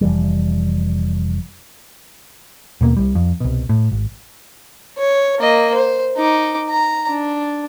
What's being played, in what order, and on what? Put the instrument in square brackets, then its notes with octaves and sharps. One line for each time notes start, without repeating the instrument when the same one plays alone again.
[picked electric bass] F1 E3 G3
D#2 B2 A#3
C2 G3
F2
C2 B2
A2
G#1
[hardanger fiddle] C#5
A#3 D#5
C5
D#4 D6
A#5
D4